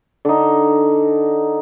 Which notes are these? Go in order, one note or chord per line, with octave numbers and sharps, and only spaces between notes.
D3 D#4